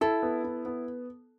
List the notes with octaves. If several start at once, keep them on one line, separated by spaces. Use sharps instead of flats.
E4 A4
B3
E4
B3